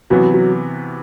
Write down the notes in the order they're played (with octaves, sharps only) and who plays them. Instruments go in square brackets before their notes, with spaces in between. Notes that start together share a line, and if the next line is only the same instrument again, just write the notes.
[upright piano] C3 E3 B3 F#4 [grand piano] F#3
[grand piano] F#3